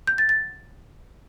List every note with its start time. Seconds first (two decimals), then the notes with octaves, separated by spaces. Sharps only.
0.07 G6
0.18 A6
0.29 A6